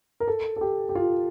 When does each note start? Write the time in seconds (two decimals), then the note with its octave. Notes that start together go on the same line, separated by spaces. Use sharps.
0.20 A#4
0.28 A4
0.56 A4
0.61 G4
0.89 G4
0.95 F4